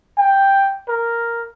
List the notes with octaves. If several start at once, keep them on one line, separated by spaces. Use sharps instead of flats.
G5
A#4